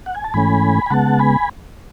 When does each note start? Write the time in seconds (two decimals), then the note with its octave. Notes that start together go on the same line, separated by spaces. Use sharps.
0.06 F#5
0.15 G#5
0.24 A5
0.34 G#2 E3 A3 C#4 G#5 B5
0.86 G#5
0.90 C#3 G#3 B3 F#5 A5
1.19 G#5 B5